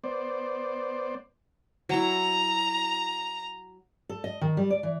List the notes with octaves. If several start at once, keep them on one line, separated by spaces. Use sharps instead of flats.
B3 C5 D5
F#3 E4 A#5
A4
D#5
D#3
G3
D5
E3